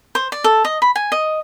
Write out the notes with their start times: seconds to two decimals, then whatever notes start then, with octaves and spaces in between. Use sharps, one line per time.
0.15 C5
0.32 D5
0.44 A4
0.65 D#5
0.82 B5
0.96 G#5
1.12 D#5